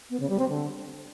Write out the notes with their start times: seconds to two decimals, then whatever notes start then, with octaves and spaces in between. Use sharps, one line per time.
0.10 B3
0.20 C#3
0.29 G3
0.39 C4
0.49 D3